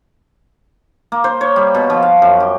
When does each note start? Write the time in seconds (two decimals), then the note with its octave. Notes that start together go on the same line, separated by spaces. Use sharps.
1.12 A#3
1.24 C5
1.41 C#5
1.56 G3
1.75 B2
1.90 F3
2.03 F5
2.22 F#2
2.40 G4